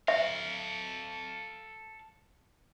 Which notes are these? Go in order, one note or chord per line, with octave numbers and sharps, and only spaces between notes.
A4 E5 F5